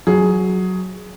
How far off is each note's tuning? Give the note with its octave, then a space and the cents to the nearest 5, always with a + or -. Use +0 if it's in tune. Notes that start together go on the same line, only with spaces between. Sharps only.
F#3 +0 G#4 +10